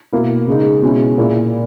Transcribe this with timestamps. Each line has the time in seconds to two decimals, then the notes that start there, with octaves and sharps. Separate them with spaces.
0.12 B2 A#3 E4
0.47 C#3 G#3 D#4
0.82 B2 G#3 C#4 E4
1.18 A#2 A#3 E4